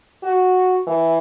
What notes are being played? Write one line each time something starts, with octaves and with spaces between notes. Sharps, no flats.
F#4
E3